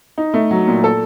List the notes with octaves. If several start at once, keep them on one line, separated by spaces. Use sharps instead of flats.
D#4
A3
F#3
A#2
A4